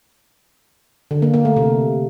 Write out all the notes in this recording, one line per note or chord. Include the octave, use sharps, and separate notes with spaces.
D3
A#3
A#3
A3
C3